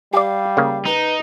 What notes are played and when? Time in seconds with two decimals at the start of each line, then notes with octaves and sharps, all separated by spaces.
0.13 G3 G4 D5 F5
0.57 C#3 A#3
0.86 D#4 B4